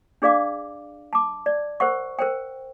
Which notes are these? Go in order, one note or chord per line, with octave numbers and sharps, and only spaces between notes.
D4 G#4 D5 F5 D6
A5 D6
D5
A#4 C5 F#5 C#6
A#4 C5 G5